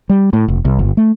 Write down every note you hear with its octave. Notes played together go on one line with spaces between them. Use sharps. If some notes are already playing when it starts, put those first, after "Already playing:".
G3
A2
F1
C2
G1
A3